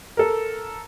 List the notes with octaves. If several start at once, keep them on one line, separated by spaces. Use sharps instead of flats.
A4 A#4